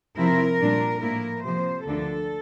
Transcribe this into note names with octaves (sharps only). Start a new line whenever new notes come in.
C3 F3 C4 E4 A#4
A#2 G3 D4
A2 F3 A#3 E4 A#4
C3 F3 A#3 C5
D2 D3 F3 A#3 D4 A4